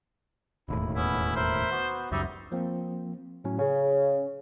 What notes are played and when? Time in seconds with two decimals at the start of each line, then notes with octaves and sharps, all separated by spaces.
0.68 E1 D#2 A2 E4
0.96 B3 C#4 E4
1.36 A#4 C5 E5 B5
1.71 B3 F#4
2.12 C#2 F#2 G3 D#4 D5 E5
2.52 F3 A#3 C4
3.44 A2 F#3 C#4
3.59 C#3 C#4